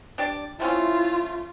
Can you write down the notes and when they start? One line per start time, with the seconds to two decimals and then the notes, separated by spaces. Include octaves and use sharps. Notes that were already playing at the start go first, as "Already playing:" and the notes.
0.18 D4 G4 D5
0.60 A3 C4 C#4 E4 F4